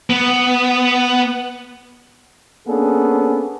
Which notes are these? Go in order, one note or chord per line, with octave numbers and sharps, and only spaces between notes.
B3
A#3 B3 C#4 D4 G#4 A4